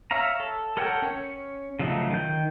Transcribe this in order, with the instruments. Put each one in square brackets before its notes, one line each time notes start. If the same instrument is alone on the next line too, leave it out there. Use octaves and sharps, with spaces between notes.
[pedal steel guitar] C#5 E5 F5 A#5
A4
A4 A#4 C#5 F#5 G5
C#4 C#5
C#3 F3 F#3 A3 D#4
D#3 G6